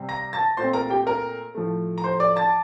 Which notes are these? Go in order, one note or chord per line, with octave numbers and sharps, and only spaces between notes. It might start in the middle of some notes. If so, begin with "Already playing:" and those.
Already playing: C3 G3 C4
A#5 A#6
A5 A6
A#2 A3 C4 C5 C6
A#4 A#5
G4 G5
A#4 A#5
A2 F3 A3
A#5
C5 C6
D5 D6
A5 A6